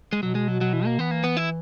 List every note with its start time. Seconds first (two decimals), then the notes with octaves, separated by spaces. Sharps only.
0.13 G#3
0.22 B2 F#3
0.35 G#3
0.48 F#3
0.61 F#3
0.73 E3
0.85 A#3
0.99 E3 B3
1.11 A#3
1.24 B3
1.37 E4